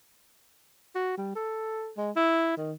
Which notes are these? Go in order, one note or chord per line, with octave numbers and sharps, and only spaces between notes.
F#4
G3
A4
G#3
E4
D#3